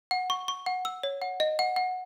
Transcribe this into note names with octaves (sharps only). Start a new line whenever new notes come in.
F#5
C#6
C#6
F#5
E6
C#5
F#5
D#5
F#5
F#5